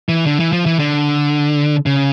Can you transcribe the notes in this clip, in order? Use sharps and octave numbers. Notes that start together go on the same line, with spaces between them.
E3
D3
E3
F3
E3
D3
C#3